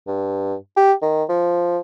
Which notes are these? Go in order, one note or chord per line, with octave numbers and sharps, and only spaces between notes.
G2
G4
D#3
F3